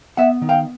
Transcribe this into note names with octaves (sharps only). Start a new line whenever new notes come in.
B3 E5 F#5
D#3
F5 G5